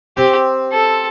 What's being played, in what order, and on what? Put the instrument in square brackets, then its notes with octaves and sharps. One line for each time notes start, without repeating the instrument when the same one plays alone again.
[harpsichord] C4 [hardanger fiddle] G4
[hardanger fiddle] A4